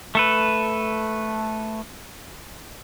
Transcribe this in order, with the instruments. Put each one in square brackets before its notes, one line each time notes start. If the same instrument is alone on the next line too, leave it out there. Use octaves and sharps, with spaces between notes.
[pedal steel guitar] A3 A4 B4